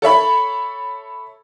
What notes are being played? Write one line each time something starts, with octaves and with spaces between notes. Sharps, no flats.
A4 C#5 E5 B5